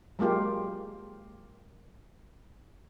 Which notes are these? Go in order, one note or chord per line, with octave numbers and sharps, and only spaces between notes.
F#3 G#3 A#3 F4 G4